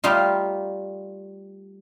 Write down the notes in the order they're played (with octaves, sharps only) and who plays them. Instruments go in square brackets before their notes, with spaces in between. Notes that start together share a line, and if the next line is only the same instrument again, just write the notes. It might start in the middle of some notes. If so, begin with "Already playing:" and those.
[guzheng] G3 A3 D#4 F4